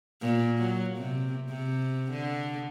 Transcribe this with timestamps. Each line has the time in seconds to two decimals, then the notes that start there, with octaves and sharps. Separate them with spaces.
0.21 A#2
0.57 F#3
0.97 C3
1.49 C3
2.12 D3